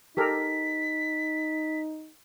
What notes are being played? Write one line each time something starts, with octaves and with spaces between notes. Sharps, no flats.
D#4 G4 A4 A#4 B6